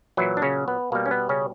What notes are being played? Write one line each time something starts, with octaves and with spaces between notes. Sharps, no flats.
A#2 E3 F#3 E4
D4
C#3 C#4
B3
B2 G3 A#3
C#4
B3
C#3 C#4